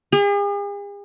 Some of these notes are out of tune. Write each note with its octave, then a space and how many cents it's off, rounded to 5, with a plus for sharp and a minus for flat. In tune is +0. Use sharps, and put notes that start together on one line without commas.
G#4 -45